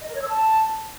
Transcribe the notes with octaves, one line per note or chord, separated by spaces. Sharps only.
D#5
A#4
C#5
E6
A5